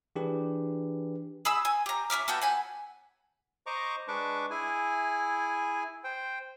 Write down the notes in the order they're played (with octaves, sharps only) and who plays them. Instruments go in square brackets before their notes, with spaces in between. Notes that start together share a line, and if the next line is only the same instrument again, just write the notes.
[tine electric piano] E3 D4 G4 G#4 B4
[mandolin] G#4 B5 E6
G#5
G4 A#5
C#4 E5 D6 F6
B3 F#4 A4 G5
F#5 G#5 B5
[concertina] C5 D#5 A#5 C#6 D6
G#3 D4 B4 C#6 D6
E4 G#4 G#5
C5 G5